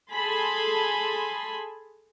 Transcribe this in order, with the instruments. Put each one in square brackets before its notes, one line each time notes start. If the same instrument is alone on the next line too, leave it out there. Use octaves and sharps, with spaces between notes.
[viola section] G#4 A4 G#5 A5 B5 C6